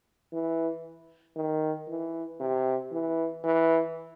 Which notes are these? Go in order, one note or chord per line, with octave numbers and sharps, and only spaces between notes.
E3
D#3
E3
C3
E3
E3